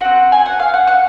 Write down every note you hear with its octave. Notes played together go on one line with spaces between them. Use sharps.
C4 F#4 F#5
G#5
F#5
F5
F#5
F#5